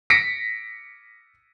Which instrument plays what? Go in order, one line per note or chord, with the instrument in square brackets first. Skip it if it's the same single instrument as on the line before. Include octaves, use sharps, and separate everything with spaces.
[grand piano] A#6 B6 C#7 D7